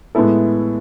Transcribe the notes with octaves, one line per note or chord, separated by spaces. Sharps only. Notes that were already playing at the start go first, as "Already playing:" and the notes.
A2 G#3 B3 E4 A4